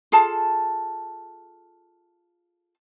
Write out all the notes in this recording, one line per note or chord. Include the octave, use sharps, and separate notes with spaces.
F4 G#4 A4 A5